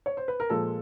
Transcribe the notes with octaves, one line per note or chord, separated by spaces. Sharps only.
C#5
C5
B4
A#4
A#2 F3 G#3 A4